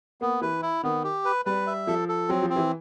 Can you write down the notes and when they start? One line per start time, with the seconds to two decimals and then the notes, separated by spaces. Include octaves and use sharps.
0.21 A#3 B3
0.41 E3 B4
0.62 E4
0.83 D#3 B3
1.04 G4
1.25 B4
1.45 G3 B4
1.67 E5
1.87 F3 A4
2.08 A4
2.29 F#3 C4
2.43 F3
2.50 C4
2.56 E3